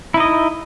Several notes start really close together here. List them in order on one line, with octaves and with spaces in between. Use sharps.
E4 D#4 D#5